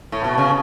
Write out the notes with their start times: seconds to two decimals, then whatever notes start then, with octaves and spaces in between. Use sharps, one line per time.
0.12 A2
0.24 B2
0.38 C#3